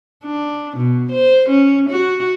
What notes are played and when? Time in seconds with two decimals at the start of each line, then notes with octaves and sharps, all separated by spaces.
0.24 D4
0.77 B2
1.12 C5
1.49 C#4
1.89 F#4